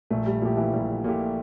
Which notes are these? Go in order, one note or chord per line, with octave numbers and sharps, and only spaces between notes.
A#1 A3
G3
A#2 F3 A3 E4 G4
E3
A#1 G3
A#2 A3 E4 G4